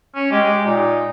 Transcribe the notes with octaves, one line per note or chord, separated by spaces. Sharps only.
C#4
G#3 G4
A#2 D#4